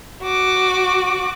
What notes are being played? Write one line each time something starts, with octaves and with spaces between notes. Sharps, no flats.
F#4 D6